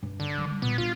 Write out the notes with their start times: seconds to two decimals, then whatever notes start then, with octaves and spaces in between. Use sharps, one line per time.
0.03 G2
0.20 D3
0.38 D#3 F#3
0.51 G3
0.62 A#2 B3
0.78 D4 F4